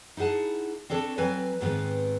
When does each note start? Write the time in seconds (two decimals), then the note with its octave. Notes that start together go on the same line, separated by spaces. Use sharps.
0.17 D#4 E4 G#4 F#5 A5
0.90 C4 D4 A4 C#5
1.18 F#3 C4 B4 G#5
1.60 D#2 G#2 D#3 B3 C4 B4